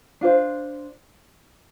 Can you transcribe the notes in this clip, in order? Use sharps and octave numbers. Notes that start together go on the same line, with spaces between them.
D4 F4 C5